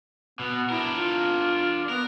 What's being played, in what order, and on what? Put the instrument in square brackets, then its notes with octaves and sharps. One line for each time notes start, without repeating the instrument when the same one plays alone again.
[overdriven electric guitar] B2 [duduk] B3
[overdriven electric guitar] D4 A#4 [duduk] E4
[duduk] F4
[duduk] B3 [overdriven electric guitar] A#4